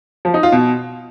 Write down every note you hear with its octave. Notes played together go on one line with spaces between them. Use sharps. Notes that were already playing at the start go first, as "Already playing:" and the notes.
F3
D#4
F4
B2